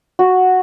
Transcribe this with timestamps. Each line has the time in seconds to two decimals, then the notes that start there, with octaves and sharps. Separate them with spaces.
0.19 F#4